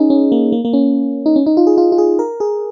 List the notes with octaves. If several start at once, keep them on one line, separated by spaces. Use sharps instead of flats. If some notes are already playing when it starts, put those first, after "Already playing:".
Already playing: C#4 D#4 G#4
C#4
A#3
A#3
A#3
C#4
D#4
C#4
D#4
F4
G#4
F4
F4
G#4
A#4
G#4